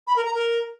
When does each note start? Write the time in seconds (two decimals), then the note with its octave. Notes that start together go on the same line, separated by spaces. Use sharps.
0.07 B5
0.16 A#4
0.25 A#5
0.35 A#4